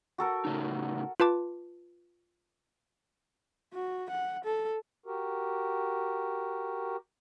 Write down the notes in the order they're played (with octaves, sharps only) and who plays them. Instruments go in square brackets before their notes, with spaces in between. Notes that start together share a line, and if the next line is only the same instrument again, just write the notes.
[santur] F#4 A4 A#4
[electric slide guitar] A2 C#3 D#4
[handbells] F4 B4 A5 D6
[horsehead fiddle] F#4
F#5
A4
[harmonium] F#4 G4 A#4